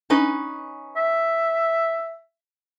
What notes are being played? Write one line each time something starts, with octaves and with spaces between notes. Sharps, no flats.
C#4 D#4 B4
E5